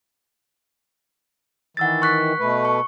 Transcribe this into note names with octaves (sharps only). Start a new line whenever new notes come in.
D#3 E3 F#5 E6 A6
C#6 F#6 B6
B2 A3 B4
C#6